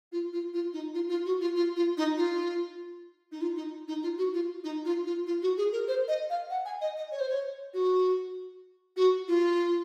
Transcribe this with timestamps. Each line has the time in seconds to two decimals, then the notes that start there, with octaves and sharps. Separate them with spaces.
0.12 F4
0.33 F4
0.54 F4
0.73 D#4
0.94 F4
1.09 F4
1.26 F#4
1.41 F4
1.56 F4
1.76 F4
1.97 D#4
2.17 F4
3.32 D#4
3.41 F4
3.57 D#4
3.88 D#4
4.03 F4
4.18 F#4
4.34 F4
4.64 D#4
4.85 F4
5.06 F4
5.27 F4
5.42 F#4
5.58 G#4
5.72 A#4
5.88 C5
6.08 D#5
6.30 F5
6.50 F#5
6.65 G#5
6.81 D#5
6.97 D#5
7.12 C#5
7.20 C5
7.29 C#5
7.74 F#4
8.97 F#4
9.28 F4